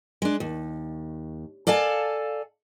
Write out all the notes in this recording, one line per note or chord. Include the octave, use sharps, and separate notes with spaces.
G#3 D4
D#2
A4 D5 F5 G#5 A5